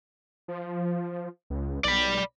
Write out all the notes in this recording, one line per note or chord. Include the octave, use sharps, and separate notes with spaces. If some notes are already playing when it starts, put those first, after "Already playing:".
F3
C#2
B1 D5 B5